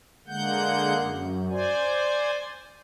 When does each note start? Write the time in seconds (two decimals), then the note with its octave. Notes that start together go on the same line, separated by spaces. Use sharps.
0.27 D3 G#3 A#3 F#5 G6
0.96 F#2
1.50 C5 D5 G#5